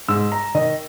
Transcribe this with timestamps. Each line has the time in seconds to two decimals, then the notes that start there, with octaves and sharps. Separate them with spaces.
0.08 G#2 E6
0.32 A#5
0.55 D#3 D#5